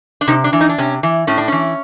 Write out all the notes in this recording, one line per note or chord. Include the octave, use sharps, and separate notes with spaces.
D4
C3 D#4
D4
E3
D#4
D4
C3 C#4
E3
A2 C#4
D4
E3 C#4